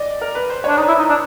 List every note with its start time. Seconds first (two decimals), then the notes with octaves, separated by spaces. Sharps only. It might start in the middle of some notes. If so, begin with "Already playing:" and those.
Already playing: D5 D#5
0.21 A#4
0.35 B4
0.50 C5
0.64 D4 C#5
0.77 D#4 D5
0.88 E4
0.99 D#4
1.09 D4